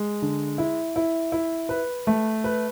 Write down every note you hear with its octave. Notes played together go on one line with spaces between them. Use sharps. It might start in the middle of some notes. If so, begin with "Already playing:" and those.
Already playing: G#3
D3
E4
E4
E4
B4
A3
B4